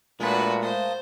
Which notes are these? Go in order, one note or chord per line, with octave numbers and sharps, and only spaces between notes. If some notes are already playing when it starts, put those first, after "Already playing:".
A#2 G#3 A3 D4 F4 F#4 B4
A#3 C5 A5 D#6